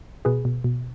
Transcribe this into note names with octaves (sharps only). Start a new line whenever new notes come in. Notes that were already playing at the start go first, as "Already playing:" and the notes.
B2 G#4 B4
B2
B2